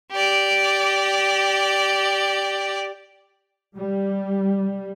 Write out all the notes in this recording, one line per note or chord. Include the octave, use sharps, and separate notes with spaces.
G4 D5
G3